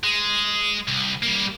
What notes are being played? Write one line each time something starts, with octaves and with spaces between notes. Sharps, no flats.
G#3
C2
G3 A#3